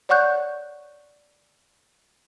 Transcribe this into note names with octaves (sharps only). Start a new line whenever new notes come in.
C#5 D5 F#5 C#6 F#6 G6